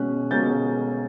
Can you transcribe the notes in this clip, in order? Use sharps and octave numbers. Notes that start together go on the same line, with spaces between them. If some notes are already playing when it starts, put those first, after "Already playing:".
Already playing: B2 G#3 C#4 F#6
B2 G#3 C#4 G6 A6